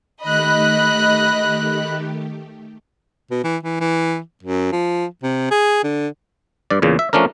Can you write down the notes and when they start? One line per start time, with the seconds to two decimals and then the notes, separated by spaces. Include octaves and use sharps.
0.23 D#3 A3 G4 D#5 B5 F#6
3.31 B2
3.44 E3
3.63 E3
3.80 E3
4.43 F#2
4.72 F3
5.23 C3
5.51 G#4
5.83 D3
6.70 G2 D5
6.82 E2 A#2 C#3
6.99 E5
7.13 F3 A3 C#4 D4 A#4